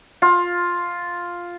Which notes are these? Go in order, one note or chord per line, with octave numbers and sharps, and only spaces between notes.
F4